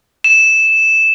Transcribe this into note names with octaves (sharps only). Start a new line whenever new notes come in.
E7